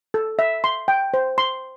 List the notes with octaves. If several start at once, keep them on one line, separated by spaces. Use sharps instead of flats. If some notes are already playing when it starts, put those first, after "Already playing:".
A4
E5
C6
G5
C5
C6